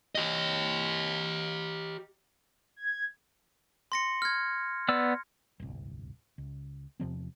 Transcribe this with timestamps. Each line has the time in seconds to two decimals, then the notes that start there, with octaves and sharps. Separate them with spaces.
0.15 G4 D#5
2.76 G#6
3.92 C6 A#6 C#7
4.22 F6 G#6
4.89 B3 D5 E6
5.60 D1 G1 C2
6.38 C#2
7.00 E2 C3 F3 C4